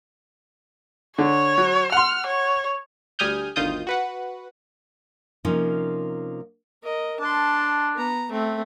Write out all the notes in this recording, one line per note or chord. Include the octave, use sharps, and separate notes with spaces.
D3 C#5
F#3
F#5 C6 F6
C#5
D2 G3 G#5 D#6 F6 G6
G1 D2 D#3 F4 D#6 G6
F#4 B4 F#5
C3 F3 A#3 C#4 D#4
A#4 D#5
D4 A5 C6
B3 A#5
A3 C4